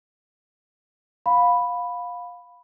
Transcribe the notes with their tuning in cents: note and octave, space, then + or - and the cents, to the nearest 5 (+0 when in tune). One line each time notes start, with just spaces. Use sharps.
F5 +20 B5 +0